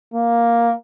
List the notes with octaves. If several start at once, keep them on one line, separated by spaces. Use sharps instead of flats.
A#3